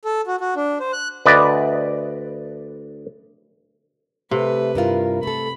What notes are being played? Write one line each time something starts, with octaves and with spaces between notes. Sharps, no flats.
A4
F#4
F#4
D4
C5
F#6
D2 B4 D5 D#5
C3 A3 B4
G2 E4 F4 A#4
A3 A4 B5